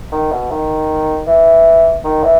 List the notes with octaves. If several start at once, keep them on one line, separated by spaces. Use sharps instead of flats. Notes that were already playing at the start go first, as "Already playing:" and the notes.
D#3
B2
D#3
E3
D#3
E3